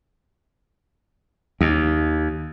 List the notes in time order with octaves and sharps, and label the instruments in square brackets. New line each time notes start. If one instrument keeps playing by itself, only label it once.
[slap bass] D#2